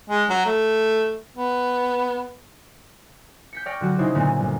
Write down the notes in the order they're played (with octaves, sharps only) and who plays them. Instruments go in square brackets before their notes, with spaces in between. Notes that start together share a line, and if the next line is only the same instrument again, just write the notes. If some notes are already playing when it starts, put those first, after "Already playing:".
[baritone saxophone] G#3
F#3
A3
B3
[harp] G6 B6 C#7
D5 G5 C#6 F6 A#6
D3 F#3 F#4
C#3 D#4 E4 F#4 C5
A#2 D3 C4 G#4
G1